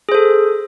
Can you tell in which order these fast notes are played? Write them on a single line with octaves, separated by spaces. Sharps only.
G#4 C5 A4